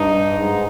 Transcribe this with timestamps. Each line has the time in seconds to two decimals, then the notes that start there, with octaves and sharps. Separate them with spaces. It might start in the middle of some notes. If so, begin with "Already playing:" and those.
Already playing: G2 D#4
0.34 G#2